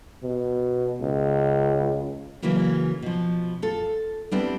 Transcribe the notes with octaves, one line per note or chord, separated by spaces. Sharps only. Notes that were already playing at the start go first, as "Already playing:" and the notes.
B2
C#2
C#3 E3 F#3 A#3 E4
B2 F3
F4 A4
G3 B3 C4 D4 E4 G4